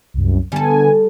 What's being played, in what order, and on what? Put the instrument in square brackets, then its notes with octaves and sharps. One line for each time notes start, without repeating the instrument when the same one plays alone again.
[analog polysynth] C2 F#2
[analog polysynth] D3 B3 G#5 [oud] G3 A4